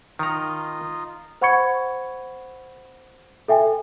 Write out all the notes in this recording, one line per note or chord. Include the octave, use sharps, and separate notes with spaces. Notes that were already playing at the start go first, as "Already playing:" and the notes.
D#3 D#4 F4 D#5 A#5
C5 F#5 B5 C#6 G#6 C#7
A4 E5 G5 G#5